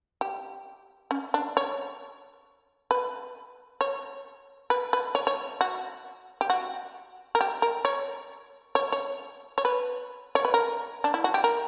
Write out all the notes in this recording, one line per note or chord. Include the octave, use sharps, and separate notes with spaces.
G4
C#4
D4
C#5
B4
C#5
B4
B4
C#5
C#5
F#4
G4
F#4
A#4
G4
A#4
C#5
C#5
C#5
C#5
B4
C#5
B4
A#4
D4
E4
F#4
G4
A#4